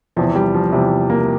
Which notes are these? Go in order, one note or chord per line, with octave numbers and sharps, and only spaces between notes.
E2 C3 E3 F3
G3
F3
E2 C3 E3 G3
A#3